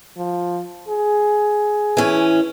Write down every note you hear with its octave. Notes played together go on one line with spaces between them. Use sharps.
F3
G#4
E3 C#4